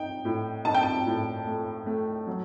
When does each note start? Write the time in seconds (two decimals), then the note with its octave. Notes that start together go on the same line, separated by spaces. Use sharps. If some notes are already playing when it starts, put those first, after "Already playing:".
Already playing: D#4 G5
0.25 A2
0.65 D#4 A5
0.74 G5
0.83 A5
1.06 A2
1.47 A3
1.86 A3
2.27 F#3